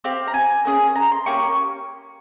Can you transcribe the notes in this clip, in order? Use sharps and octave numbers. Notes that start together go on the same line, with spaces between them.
C4 G4 F5
A#5
G#5
A#3 C#4 G#4
A#5
C6
A#3 C#4 G4 C#6